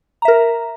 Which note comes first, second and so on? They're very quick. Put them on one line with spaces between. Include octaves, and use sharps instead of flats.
A#5 E5 A#4